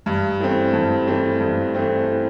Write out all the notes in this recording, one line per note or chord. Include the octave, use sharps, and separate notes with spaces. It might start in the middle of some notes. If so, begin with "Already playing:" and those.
G2
E3 A3 C4
G2
E3 A3 C4
G2
E3 A3 C4